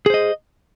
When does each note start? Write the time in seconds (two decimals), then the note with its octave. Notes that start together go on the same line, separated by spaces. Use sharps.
0.06 G#4
0.10 C5
0.14 D#5